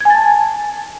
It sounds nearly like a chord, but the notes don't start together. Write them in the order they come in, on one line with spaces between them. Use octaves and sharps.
G#6 G#5 A6 A5